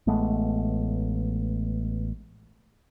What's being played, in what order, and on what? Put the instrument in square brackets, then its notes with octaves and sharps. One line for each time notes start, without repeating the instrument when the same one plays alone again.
[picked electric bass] A1 G#3 A3 B3